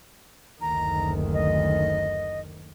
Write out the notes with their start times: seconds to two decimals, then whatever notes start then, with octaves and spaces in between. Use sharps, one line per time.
0.61 F#1 D2 D#3 A#5
1.33 D#5